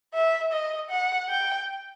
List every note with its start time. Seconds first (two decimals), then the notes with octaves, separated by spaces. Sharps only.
0.14 E5
0.52 D#5
0.90 F#5
1.29 G5